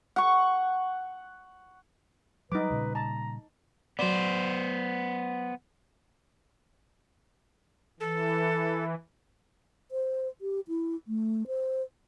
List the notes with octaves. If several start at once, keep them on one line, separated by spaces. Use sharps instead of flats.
F#5 C#6
F#3 G3 D#4 B4 D6
A#2 C#3 G3
A5 A#5
F#3 B3 C5 D5
E3 A4
C5
G4
E4
A3
C5